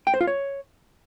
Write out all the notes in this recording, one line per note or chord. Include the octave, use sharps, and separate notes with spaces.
G5
C5
F4
C#5